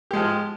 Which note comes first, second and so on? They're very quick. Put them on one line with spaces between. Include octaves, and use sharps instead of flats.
G4 G#3 F3